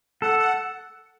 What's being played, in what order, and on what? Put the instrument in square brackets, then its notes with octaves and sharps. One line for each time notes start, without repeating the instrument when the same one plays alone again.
[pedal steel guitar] A4 [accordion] F#5
[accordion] F#5